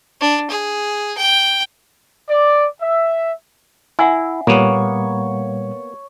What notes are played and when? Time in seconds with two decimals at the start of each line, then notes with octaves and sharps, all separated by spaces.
0.20 D4
0.50 G#4
1.17 G5
2.29 D5
2.82 E5
3.99 E4 E5 F#5 G#5
4.47 A#2 G3 A#3 B3 C#5